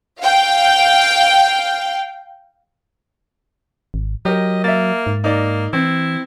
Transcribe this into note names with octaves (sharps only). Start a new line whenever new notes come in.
F5 G5
G#1
F#3 G4 A#4 D#5
A#3 E5 A6
G#2
A#3 D#4 D5
E3 C4 E4